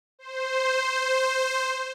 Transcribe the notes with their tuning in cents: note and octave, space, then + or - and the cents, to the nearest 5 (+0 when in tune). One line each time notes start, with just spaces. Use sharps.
C5 +0